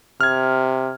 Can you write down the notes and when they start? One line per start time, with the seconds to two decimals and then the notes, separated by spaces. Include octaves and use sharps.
0.21 C3 F6 G#6